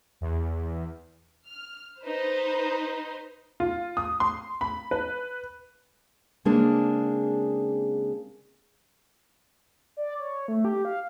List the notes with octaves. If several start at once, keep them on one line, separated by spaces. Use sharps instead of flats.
E2
F6
D#4 B4 C5
F4
D#6
C6
B5
B4
C#3 G#3 A#3 C4 D4 G#4
D5
C#5
A3
G4
F5